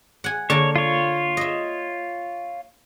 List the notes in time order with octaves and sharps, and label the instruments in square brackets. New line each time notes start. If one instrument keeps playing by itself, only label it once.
[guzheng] F#5 G#5
[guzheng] D3 A#3 A5 [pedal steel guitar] C#5
[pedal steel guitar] F4 C#5
[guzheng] D#5 E5